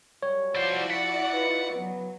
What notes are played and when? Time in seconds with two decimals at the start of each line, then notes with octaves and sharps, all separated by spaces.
0.23 F#2 G3 C#5
0.55 F3 G3 E4 F#4 C5 D5
0.90 F#5 B6
1.33 D#4 F4 B4
1.76 C#3 E3 F#3 B3